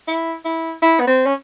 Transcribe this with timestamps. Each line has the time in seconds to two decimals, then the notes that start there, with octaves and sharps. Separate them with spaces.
0.08 E4
0.45 E4
0.82 E4
1.00 B3
1.07 C4
1.26 C#4